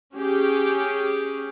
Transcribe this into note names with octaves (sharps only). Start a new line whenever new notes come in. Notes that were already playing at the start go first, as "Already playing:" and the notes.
C#4 G4 G#4